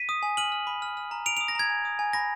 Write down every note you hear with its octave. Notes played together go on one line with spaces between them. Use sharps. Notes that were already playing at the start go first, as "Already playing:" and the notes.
Already playing: B6 D#7
D#6
G#5
F6 D#7 F#7
F6
B5
F6
F6
A#5
A#5 D7 F7
D#6 D7 F7
A#6
A#5 G#6
G#5
D#6
G#5
B5 A#6